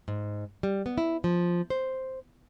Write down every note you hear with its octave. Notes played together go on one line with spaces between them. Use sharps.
G#2
G3
B3
E4
F3
C5